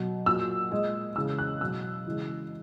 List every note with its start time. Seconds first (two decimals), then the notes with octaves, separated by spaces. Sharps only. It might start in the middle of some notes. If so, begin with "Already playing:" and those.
Already playing: B2 F#3
0.26 A#2 F#3 E6
0.71 A#2 G#3
1.16 C#3 E3 G#3 E6
1.39 F#6
1.61 B2 F#3 E6
2.06 C#3 E3 G#3